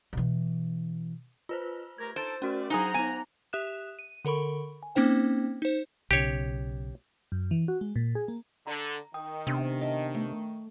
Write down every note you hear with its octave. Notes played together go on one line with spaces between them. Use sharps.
B2 E3
F4 B4 C5
A3 G4 A#4 G#6
D#4 A4 C5 A6 D7
A3 C#4 F#4 A#4 D5
F#3 D#4 G#4 C5 F#5 G#5 A#5 G7
B3 D#4 G#5
G4 E5 D#6 F#6 E7
D#7
D3 A4 A#4 B5 C#6
G#5
A#3 C4 C#4 D#4 C5 G5
D#4 C5
B1 C#3 G4 C#5
F#2
E3
F#4
G#3
A#2
G#4
A#3
D3 A#5
D#3 G5 D#6
C3 B3 D4
D#5 E5 A5
A3